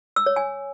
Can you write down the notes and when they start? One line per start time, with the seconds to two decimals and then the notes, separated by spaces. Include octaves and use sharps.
0.16 E6
0.26 C#5
0.36 G#5